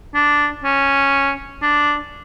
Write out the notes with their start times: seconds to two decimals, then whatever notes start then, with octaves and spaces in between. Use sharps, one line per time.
0.15 D4
0.64 C#4
1.62 D4